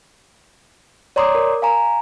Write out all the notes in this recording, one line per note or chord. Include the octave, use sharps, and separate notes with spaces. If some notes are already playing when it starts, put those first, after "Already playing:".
C#5 D5 A#5 C6 D6 D#6
A#4
F5 G#5 A#5